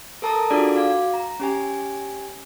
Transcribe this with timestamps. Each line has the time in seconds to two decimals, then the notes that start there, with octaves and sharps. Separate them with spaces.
0.22 A4 A#4 A5 A#5 D#6
0.50 D4 F4 F#4 G#4 A4 D5
0.75 F#4 F5 D6
1.14 A#5
1.40 C#4 G4 G#5